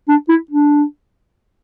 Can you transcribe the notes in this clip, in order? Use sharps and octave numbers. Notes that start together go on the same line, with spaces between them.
D4
E4
D4